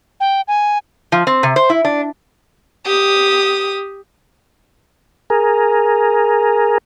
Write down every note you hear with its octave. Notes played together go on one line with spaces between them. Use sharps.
G5
G#5
F3
C4
C3
C5
E4
D4
G4 D#6
G#4 A#4